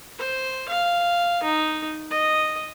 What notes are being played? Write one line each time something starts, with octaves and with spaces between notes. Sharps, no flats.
C5
F5
D#4
D#5